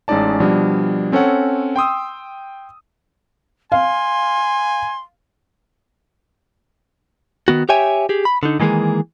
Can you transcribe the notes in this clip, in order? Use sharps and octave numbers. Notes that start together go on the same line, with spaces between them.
A1 G#3 C#4 D#4 D5 A5
B2 F3 G3 D4
C4 C#4 A4 C#5 F#5
G5 C6 D#6 E6
F5 G#5 C6
D#3 B3 F#4
G4 C#5 E5 G5 G#5
G4 G#4
B5
D3 D#4
D#3 E3 G#3 A#3 G#4